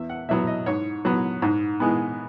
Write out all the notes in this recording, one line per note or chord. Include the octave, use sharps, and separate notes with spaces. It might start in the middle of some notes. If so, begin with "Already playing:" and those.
Already playing: E2 E5
F#5
B2 F#3 B3 E5
D#5
G#2 C#5
F#3 B3
G#2
E3 G#3 B3